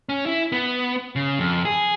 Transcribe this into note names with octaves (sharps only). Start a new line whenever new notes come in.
C#4
E4
B3
C#3
F2
G#4